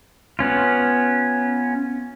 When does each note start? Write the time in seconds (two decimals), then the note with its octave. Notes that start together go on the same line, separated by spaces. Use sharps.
0.39 B3 C#4 F4